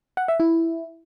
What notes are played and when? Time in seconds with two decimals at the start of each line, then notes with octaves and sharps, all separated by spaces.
0.17 F#5
0.28 E5
0.40 E4